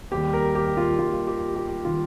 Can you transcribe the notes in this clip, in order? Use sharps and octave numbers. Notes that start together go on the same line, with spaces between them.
D#2 D#3 G3 G4
A#4
G4
F4
D#2 D#3 G3 F4
G4
G4
D#3 G3 F4